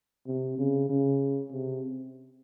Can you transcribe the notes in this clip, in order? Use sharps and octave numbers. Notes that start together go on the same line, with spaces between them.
C3
C#3
C#3
C3